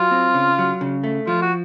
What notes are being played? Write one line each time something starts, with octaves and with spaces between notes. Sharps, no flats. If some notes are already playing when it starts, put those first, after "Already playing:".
Already playing: F#3 F4
C4
C#3
F#3
C#3
A3
F3 F4
F#4